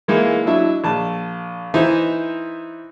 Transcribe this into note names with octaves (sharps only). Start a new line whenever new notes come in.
E3 G#3 A#3 D#4 E4
F#3 D4 E4 D#5 E5
A#1 A5
E3 D#4 C5 E5